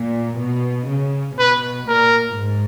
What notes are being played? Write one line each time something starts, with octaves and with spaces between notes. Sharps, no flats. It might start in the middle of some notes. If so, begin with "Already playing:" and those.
Already playing: A#2
B2
C#3
B2 B4
A#2 A#4
G#2